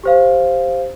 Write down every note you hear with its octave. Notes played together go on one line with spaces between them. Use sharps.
G4 C5 F5